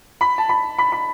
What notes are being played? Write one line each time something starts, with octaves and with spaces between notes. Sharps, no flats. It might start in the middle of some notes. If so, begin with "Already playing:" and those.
B5
A5
B5
B5
B5